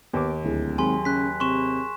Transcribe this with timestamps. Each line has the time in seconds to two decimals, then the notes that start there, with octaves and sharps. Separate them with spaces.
0.13 D#2 B3 D6
0.44 D1 D2 E4 G#4
0.78 G#1 F#3 G#4 G#5 B5 C6
1.05 C#3 F#6 B6
1.40 C3 C6 C#6 E7